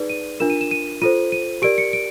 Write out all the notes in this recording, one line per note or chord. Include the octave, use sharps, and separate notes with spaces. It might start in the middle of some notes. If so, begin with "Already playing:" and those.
Already playing: D#4 G#4 B4 D5
D#7
D4 F4 A#4 E7
D#7
E7
D#7
F4 A4 C5 D#7
D#7
G4 A#4 D5 D7
C#7
D7